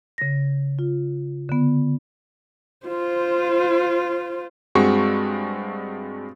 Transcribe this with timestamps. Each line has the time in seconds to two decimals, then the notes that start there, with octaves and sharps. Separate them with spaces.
0.18 C#3 A#6
0.79 F4
1.49 D3 B3
2.87 F4 C5
4.75 G2 G#3 C4 F#4 C#6